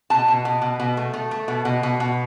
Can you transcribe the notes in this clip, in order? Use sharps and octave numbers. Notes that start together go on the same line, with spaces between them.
B2 A5
B2
B2
B2
B2
A3
A3
A3
B2
B2
B2
B2